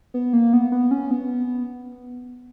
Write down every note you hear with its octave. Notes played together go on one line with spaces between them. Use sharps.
B3
A#3
B3
B3
C#4
B3